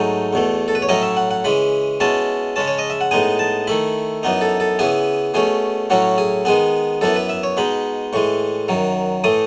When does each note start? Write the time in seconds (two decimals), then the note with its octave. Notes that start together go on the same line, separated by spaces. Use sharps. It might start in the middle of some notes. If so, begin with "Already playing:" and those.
Already playing: G#2 F#3 A3 D#4 G#5
0.33 E2 B2 A3
0.68 A4
0.75 B4
0.82 C#5
0.89 A2 F#3 C#4 E4 D#5
1.02 E5
1.17 F#5
1.31 F#5
1.44 C#3 E3 G#3 B5
2.00 B2 G#3 C#4 E4 A5
2.56 C#3 G#3 C#4 A5
2.68 C#5
2.79 D#5
2.90 E5
3.01 F#5
3.11 A2 G#3 B3 D#4 G#5
3.39 A5
3.67 D#3 A3 E4 B5
4.23 F#2 E3 B3 D#4
4.41 A4
4.60 A4
4.79 C#3 E3 B3 E4 G#4
5.34 B2 A3 C#4 G#4
5.90 A2 F#3 C#4 E4 F#4
6.18 G#4
6.45 D#3 G#3 B3 G#4
7.01 F#2 E3 B3 E4 A4
7.16 B4
7.29 E5
7.43 C#5
7.57 B2 G#3 D#4 B5
8.13 A2 E3 G#3 C#6
8.68 F#2 D#3 F#3
9.24 A2 E3 A3 D#6